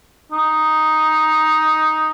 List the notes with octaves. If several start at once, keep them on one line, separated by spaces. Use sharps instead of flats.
D#4